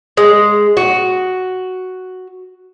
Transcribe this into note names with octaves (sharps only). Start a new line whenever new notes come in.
G#3
F#4